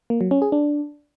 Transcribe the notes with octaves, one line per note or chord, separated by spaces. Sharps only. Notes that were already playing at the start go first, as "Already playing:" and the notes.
A#3
F#3
C#4
G#4
D4